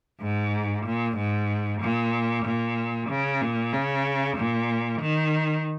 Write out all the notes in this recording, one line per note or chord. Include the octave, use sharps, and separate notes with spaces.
G#2
A#2
G#2
A#2
A#2
C#3
A#2
C#3
A#2
D#3